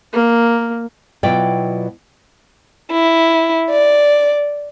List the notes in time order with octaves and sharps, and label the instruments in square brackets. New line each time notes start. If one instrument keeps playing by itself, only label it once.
[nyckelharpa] A#3
[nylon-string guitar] B2 F#3 E4 F4 D5 G5
[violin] E4
D5